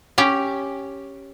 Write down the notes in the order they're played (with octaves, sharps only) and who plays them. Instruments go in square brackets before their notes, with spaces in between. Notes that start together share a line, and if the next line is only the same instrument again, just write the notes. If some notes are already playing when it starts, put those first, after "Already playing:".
[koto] C#4 G4